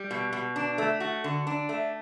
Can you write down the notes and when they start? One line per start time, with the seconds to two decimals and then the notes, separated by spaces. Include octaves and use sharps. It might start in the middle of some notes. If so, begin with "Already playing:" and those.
Already playing: G3
0.11 B2
0.33 B2
0.56 D4
0.78 A3
1.00 F#4
1.24 D3
1.47 D4
1.69 A3